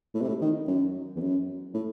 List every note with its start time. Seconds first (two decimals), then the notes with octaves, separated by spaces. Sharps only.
0.14 A2
0.22 C3
0.28 A2
0.41 D#3
0.68 F#2
1.16 E2
1.20 F#2
1.74 A2